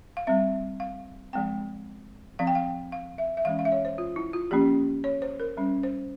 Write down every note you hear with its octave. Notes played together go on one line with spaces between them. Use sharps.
F5
G3 C4 E5
F5
F3 G#3 C4 G5
F3 C4 F5
G5
F5
F5
E5
E5
E3 G#3 C#4 F5
F5
E5
C#5
C5
F4
E4
F4
F3 A#3 C#4 G4
C#5
C5
A#4
G3 C#4
C5